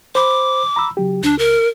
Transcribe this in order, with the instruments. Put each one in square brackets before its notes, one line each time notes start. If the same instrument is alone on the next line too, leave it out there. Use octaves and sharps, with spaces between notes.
[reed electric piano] C5 B5 [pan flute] D6
[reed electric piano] A#5 B5 E6
C#3 F#3 G4
[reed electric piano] C#2 [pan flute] D4
[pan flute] A#4